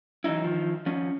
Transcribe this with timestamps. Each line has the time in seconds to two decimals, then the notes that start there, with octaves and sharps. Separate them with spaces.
0.24 E3 F#3 C#4 D#4 E4
0.44 D#3 F3
0.86 F3 C#4